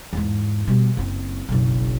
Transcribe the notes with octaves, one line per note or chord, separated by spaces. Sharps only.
E2 G#2
B2 G3
F#1 C4
F#1 B1